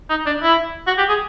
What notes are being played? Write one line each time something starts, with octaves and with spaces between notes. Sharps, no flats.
D#4
D4
E4
F#4
G4
G#4